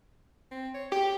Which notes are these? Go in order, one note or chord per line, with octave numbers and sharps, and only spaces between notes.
C4
C#5
G4 G5